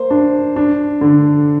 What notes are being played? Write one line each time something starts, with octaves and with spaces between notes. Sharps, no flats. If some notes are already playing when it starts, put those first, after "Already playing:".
Already playing: A#3 C5
D4
D4
D3